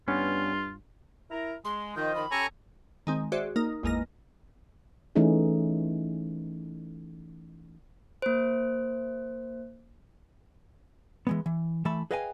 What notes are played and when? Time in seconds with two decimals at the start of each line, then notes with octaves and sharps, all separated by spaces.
0.08 G2 B3 C#4 F4
1.31 E4 A#4 A#5
1.65 G#3 C6
1.96 D#3 F3 F4 D#5 G6
2.15 D#3 B5
2.31 C#4 G4 A4 G#5 A#5 C#6
3.07 D#3 G#3 C4
3.32 F#4 G#4 C5 D5 E5
3.56 A#3 D#4 A#4
3.83 G#1 E2 G#3 A#3 D#5 A#6
5.16 E3 A3 C#4 D#4 G#4
8.22 A#3 C5
11.27 E3 G#3 B3
11.46 E3
11.85 E3 A3 E5 A5 B5
12.11 G#4 B4 D#5 F5 G5 G#5